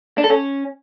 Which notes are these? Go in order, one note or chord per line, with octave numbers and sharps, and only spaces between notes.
D4
A4
C#4